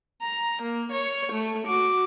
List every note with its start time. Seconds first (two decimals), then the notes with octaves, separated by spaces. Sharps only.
0.22 A#5
0.62 A#3
0.92 C#5
1.33 A3
1.67 F#4 D6